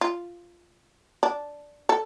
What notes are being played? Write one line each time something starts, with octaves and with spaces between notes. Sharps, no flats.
F4
D4
A4